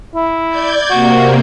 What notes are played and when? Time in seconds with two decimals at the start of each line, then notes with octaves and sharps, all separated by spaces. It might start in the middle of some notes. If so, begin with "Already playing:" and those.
0.15 E4
0.49 D5 G6 G#6
0.90 C3 A#3 F#4